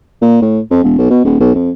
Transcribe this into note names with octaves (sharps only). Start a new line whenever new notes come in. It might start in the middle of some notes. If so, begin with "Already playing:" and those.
A#2
A2
F2
E1
B1
B2
D#1
B1
F2